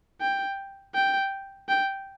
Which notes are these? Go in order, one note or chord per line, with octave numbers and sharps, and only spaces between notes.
G5
G5
G5